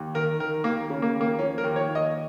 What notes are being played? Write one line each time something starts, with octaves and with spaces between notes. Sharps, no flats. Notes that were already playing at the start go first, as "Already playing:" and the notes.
Already playing: D#2
D#3 A#4
D#3 A#4
D#2 A#3
C#3
A#3
D#2
A#3
F3 C#4
A#4
D#2
C#5
D#2
D#5